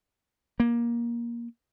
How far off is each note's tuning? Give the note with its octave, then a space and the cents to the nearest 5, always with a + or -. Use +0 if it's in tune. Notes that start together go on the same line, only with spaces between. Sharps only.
A#3 +15